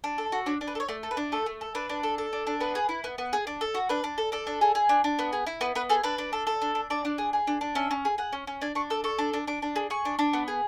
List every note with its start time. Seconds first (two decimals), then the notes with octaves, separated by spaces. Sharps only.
0.04 D4
0.18 A4
0.32 F#4
0.46 D4 C#5
0.61 D4
0.67 B4
0.75 A4
0.80 C#5
0.88 A3 D5
1.03 A4
1.11 B4
1.17 D4
1.32 A3 A4
1.46 A3
1.61 A4
1.75 D4 B4
1.89 D4
2.03 A4
2.18 A4
2.33 D4
2.47 D4
2.60 B3 B4
2.75 G#4
2.89 E4
3.04 B3
3.18 B3
3.33 G#4
3.47 D4
3.61 A4
3.75 F#4
3.89 D4 B4
4.04 D4
4.18 A4
4.32 D4 A4
4.47 D4
4.61 G#4
4.75 G#4
4.89 D4
5.04 D4
5.19 B3
5.33 G#4
5.47 E4
5.61 B3 B4
5.75 B3 B4
5.89 G#4 A4
6.03 D4 B4
6.18 D4
6.33 A4
6.47 A4
6.61 D4
6.75 D4
6.90 D4 D5
7.05 D4
7.18 G#4
7.33 G#4
7.47 D4
7.61 D4
7.75 C#4 E5
7.91 C#4
8.05 G#4
8.18 G#4 F#5
8.32 C#4
8.47 C#4
8.61 D4 G#5
8.75 D4 C#6
8.90 A4 E6
9.04 A4 C#6
9.18 D4
9.33 D4
9.47 D4 D6
9.62 D4
9.76 G#4
9.90 G#4 C#6
10.05 D4
10.19 D4
10.33 B3
10.48 G#4